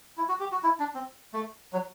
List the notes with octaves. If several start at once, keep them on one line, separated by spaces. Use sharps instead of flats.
E4
F#4
G4
F#4
E4
D4
C4
A3
F#3